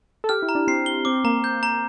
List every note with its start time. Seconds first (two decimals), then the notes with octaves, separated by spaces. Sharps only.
0.24 A4
0.29 G4 F6
0.42 E4
0.49 A#5
0.55 D4
0.67 C4 C7
0.86 G7
1.05 C4 D6
1.24 A#3 A#5
1.44 G6
1.63 A#5